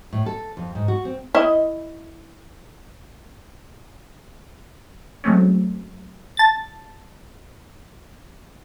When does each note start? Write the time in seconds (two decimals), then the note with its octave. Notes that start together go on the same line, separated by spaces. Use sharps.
0.13 A2
0.26 A4
0.57 F2
0.75 G#2
0.88 F#4
1.05 C4
1.35 E4 D#5
5.24 F#3 G#3 A3 C4 C#4
6.37 A5 A6